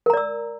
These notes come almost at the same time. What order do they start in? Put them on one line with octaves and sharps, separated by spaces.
A#4 A#5 D5 E6